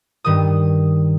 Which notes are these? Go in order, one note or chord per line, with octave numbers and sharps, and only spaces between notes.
G2 D#3 D#6